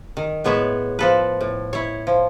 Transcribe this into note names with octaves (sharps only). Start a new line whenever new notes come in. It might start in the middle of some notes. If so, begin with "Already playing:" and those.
D#3
A2 G#3 B3 C#5 E5
F3 A4 B4
A2
E4 C#5
F3